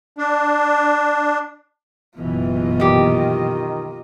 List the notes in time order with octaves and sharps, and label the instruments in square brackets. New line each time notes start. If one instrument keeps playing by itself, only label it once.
[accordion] D4
[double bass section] F#1 B2 E3 [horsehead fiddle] F4 D#5
[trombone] D#3 [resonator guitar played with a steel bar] D#4 G4